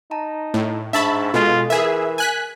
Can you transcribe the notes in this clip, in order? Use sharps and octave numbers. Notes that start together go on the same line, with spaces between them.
D#4 A5 A#5
A2
G#2 D4 E5 A5 B5 C#6
B2 G#3 F4 A4 F5
E3 G#4 A#4 E5
G#5 F#6 B6